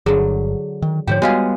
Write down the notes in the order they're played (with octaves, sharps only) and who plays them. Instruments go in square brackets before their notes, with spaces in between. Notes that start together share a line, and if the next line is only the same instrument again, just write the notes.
[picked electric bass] G1 [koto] D3 F#3 [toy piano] G#4
[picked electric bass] D#3
[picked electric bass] G#2 D3 F3 [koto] G4 C5 [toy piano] C#5 G5
[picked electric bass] G3 B3 [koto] G#3 F4 G#4 [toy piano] F#4 F5